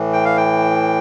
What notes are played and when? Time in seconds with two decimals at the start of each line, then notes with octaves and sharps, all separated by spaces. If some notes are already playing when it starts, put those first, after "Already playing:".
Already playing: A2 E3
0.13 G5
0.25 F5
0.37 G5